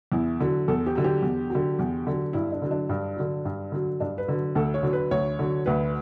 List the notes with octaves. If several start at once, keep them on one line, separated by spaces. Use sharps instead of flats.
E2 E4
D3 F#3
E2 A4
G4
D3 F#3
G4
E2
D3 F#3
E2
D3 F#3
G2 E4
D4
D3 F#3
D4
G2
D3 F#3
G2
D3 F#3
G2 D4
B4
D3 F#3
D2 A4
C#5
D3 F#3
B4
D2 C#5
D3 F#3
D2 B4